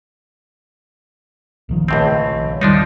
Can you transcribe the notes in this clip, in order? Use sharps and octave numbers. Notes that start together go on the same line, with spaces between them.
A#1 D#3 F3
C#2 A2 C4
D#1 D#3 F3 G3 D4 D#4